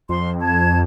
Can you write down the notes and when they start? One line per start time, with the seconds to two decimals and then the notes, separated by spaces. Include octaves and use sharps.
0.09 F2 C6
0.41 A5 G#6